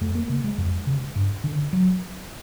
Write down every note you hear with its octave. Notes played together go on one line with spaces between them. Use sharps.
F2 A3
A#3
C#3
G#3
F2
C#3
G2
D3
F#3